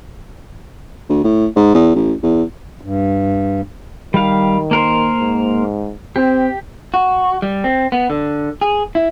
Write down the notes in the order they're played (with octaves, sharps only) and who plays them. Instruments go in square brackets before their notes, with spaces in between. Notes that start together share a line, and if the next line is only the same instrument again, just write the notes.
[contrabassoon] D2
A2
G#2
E2
A1
E2
[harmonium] G2
[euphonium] D#3 [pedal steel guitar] G3 F5
[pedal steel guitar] A#3 A#4 C5
[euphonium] G#2
[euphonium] C4 [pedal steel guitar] G4
[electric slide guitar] F#4
G3
C4
B3
D3
G#4
E4